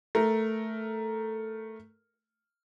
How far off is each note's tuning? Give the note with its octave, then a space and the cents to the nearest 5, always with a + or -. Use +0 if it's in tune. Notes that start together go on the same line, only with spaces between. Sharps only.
A3 +0 A#4 +0